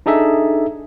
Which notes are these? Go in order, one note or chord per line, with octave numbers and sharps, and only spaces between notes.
D4 D#4 G#4 A4 E5